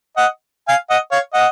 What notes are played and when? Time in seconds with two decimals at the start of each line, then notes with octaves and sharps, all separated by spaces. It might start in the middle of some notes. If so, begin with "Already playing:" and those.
0.17 D#5 F#5
0.68 F5 G#5
0.90 D#5 F#5
1.12 C#5 F5
1.34 D#5 F#5